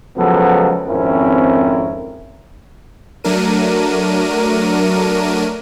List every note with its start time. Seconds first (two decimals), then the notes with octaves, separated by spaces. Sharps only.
0.17 C#2 F3 F#3 B3 G#4 A4
0.87 G#1 F2 C4 C#4 E4 A#4
3.24 F#3 A3 D4 A#4 D#7